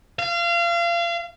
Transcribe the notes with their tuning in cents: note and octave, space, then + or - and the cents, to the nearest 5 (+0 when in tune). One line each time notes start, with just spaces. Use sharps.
F5 -30